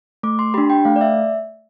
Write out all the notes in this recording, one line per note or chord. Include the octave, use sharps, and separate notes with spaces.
A3 D6
C6
D4 G4 B5
G5
A3 F5
D5
E5